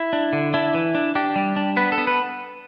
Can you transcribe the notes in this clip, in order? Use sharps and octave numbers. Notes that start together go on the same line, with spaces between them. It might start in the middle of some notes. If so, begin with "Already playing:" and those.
Already playing: E4
D4
D3
D4 E4
E3
D4
D4 G4
G3
D4
B3 B4
A4
B3
B4